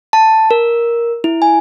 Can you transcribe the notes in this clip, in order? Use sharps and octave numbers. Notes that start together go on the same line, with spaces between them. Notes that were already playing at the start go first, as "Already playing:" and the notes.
A5
A#4
E4
G#5